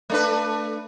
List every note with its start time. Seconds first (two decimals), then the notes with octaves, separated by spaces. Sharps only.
0.10 A3 D4 B4